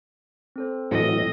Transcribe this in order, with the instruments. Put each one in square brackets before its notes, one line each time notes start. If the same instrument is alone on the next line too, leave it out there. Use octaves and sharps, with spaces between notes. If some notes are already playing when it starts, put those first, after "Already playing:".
[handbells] C4 A4 C5
[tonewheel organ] A2 E3 F#3 [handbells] C4 A4 [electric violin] D#5